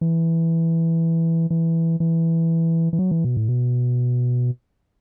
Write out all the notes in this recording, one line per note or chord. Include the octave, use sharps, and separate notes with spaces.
E3
E3
E3
E3
F#3
E3
B2
A2
B2